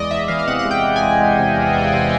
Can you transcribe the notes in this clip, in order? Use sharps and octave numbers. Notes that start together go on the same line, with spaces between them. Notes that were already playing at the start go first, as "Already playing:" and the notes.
Already playing: E2 G#3 D5 D#5
E2 E5
E3 F5
F5
C3 F#5
F#5
G#3
G5
E3
G#5
G#3
G#3
C3
E2
E2
C3